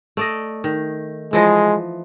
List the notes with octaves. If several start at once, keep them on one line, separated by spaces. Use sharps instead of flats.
A3 D5 D#5
D#3
E3 F3 G#3 D#5